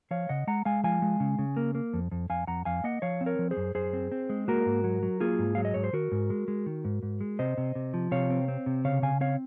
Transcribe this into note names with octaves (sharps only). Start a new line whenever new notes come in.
F3 C#5 F5
C#3 D#5 F#5
G#3 F#5 A#5
G#3 F5 G#5
F3 F5 G#5
G#3
C#3
C#3
A#3
A#3
F2
F2
F2 F5 G#5
F2 F#5 A#5
F2 F5 G#5
A#3 D#5 F#5
F3 C#5 F5
C4
A#4 C#5
F3
G#4 C5
F#2
F#2 G#4 C5
C4
C4
G#3
A#3 F#4 A#4
G#2
F#3
F#3
A#3 F4 G#4
G#2
F#3 F5
D#5
G#2 C#5
C5
D#3 F#4 A#4
G#2
G#3
G#3
D#3
G#2
G#2
G#3
C3 C5 D#5
C3
C3
F3
C3 C#5 F5
C4
C4
C3
C#3 C#5 F5
C#3 F5 G#5
C4 C#5 F5